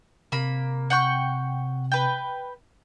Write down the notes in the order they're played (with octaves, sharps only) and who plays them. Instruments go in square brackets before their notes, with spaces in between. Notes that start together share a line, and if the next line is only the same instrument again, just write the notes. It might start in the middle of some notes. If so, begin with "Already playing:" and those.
[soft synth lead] C3 [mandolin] A#3 B5
[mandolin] F#5 G5 C#6
B4 G5